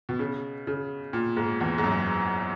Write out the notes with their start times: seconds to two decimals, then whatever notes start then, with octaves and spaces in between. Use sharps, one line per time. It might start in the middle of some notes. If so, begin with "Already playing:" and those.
0.09 B2
0.19 C#3
0.67 C#3
1.13 A#2
1.37 G#2
1.60 E2
1.78 G#2
1.84 F#2